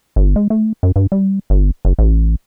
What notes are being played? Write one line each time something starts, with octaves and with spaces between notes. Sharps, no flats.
G1
G#3
A3
F#2
G2
G3
G1
F#1
A1